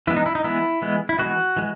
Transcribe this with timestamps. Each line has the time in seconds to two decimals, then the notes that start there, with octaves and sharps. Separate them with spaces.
0.07 E3 G#3 B3 E4
0.17 D#4
0.26 E4
0.35 D#4
0.44 E3 G#3 B3 E4
0.82 E3 G#3 B3
1.09 E4
1.19 E3 G#3 B3 F#4
1.57 E3 G#3